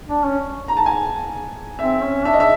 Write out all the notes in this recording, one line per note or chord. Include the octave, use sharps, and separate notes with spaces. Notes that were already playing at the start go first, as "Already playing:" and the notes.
D4
C#4
A#5
A5
G#5
C4 E5
C#4
D4 E5
D#5
E5